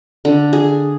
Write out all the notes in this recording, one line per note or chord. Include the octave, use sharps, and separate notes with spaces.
D3
G#4